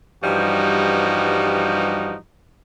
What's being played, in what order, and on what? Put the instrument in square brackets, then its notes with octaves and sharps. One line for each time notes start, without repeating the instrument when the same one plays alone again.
[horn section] G2 E3 F3 G3 D#4 F#4